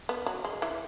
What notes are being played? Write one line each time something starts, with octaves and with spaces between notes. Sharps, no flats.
B3
F#3
G#3
E3